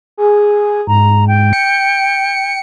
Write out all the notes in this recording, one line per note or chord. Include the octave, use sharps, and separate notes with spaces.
G#4
G#2 A#5
G5
C#7